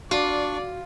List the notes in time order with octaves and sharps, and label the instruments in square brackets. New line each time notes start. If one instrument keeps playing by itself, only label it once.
[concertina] D4 C#6 [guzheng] F4 [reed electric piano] F#4 [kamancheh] D5